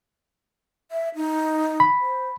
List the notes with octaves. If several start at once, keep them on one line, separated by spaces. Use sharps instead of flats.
E5
D#4
B5
C5